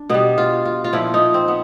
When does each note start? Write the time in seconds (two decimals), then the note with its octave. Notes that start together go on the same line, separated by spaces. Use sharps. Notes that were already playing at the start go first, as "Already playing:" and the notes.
Already playing: D4
0.09 B2 G3 B3
0.38 F4
0.65 F4
0.84 F4
0.93 A#2 F3 E4
1.14 D#4
1.34 C4
1.48 B3